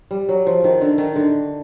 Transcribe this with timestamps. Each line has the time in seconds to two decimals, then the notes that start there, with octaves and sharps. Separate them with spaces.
0.11 G3
0.29 F#3
0.47 F3
0.64 D#3
0.81 D3
0.98 D#3
1.16 D3